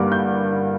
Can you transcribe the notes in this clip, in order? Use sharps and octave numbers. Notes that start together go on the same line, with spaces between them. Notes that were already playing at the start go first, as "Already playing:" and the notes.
Already playing: G2 D3 G3 A#3 D6
G6